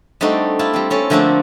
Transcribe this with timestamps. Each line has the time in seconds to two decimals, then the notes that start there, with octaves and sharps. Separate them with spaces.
0.21 G3 A3 C4 D4 D#4 F#4
0.59 E4 F4 G4 A5
0.73 G3 C4
0.90 C4 C#4 A4
1.10 D3 F3 A3 A#3 C4 D4